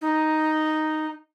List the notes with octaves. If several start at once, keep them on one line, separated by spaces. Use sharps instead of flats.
D#4